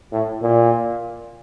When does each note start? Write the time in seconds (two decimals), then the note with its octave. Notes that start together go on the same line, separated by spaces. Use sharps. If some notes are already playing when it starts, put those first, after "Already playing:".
0.12 A2
0.42 A#2